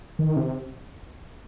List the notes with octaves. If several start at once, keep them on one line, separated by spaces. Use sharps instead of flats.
D#3
C3